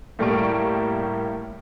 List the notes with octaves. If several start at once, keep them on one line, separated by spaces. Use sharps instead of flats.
A2 G3 A#3 A5 C#6 D7